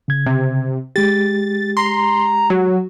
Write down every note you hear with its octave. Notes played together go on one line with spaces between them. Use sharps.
C#3 G#6
C3
G#3 G4 A6
A#5 C6
F#3 F#4